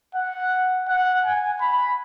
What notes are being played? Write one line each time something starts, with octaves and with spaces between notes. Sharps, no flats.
F#5
F#5
G#5
B5